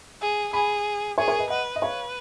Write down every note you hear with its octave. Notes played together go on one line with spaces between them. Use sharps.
G#4
G#4 G#5 B5
G#4 A#4 C#5
A#4 C#5
B4 D#5
B4 D#5 F#5
D#5
B4 C#5 F5